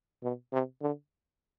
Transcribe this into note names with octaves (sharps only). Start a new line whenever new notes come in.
B2
C3
D3